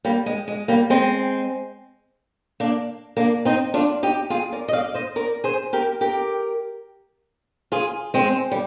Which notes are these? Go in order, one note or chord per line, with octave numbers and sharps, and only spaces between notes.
G3 A#3
G#3
G#3
G3 A#3
G#3 C4
A#3 D4
A#3 D4
C4 D#4
D4 F4
D#4 G4
F4 G#4
A#4 D5
D#5
D5 F5
C5 D#5
A#4 D5
G#4 C5
G4 A#4
G4 A#4
F4 G#4
G#3 C4
G3